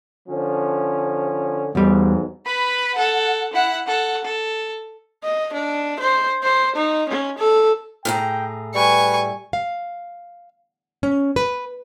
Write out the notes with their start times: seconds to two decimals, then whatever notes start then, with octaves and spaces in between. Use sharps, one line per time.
0.29 D3 F3 C#4
1.75 B1 E2 G#2 G3
2.45 B4 B5
2.95 A4 F#5
3.53 E4 F#5
3.86 A4 F#5
4.24 A4
5.24 D#5
5.53 D4
6.00 C5
6.43 C5
6.75 D#4
7.09 C#4
7.38 A4
8.05 A2 G#4 G5 A#5
8.75 G3 B4 G#5 C#6
9.53 F5
11.03 C#4
11.36 B4